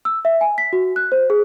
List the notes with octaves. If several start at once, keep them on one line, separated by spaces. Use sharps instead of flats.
E6
E5
G#5
B6
F#4
F#6
C5
G#4